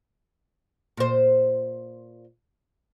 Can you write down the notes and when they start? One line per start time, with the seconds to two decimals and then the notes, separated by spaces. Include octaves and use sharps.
0.97 A#2 C5